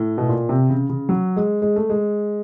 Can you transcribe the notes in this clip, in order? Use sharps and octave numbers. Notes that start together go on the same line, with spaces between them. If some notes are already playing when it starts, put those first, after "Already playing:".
Already playing: A2
B2
A#2
C3
C#3
C#3
F#3
G#3
G#3
A3
G#3